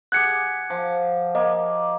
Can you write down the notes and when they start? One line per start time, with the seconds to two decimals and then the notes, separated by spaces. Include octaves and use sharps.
0.12 G4 G#4 F#5 F#6 G#6 C#7
0.70 F3
1.35 A#3 D#5